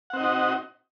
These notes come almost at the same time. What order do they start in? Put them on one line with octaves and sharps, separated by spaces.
F#5 C4 D#5 D#4 F#4